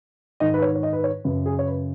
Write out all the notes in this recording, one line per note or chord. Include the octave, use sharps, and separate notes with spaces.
G#2 D#3 D#5
B4
C#5
C#5
D#5
B4
C#5
F#2 C#3 B4
G#4
C#5
B4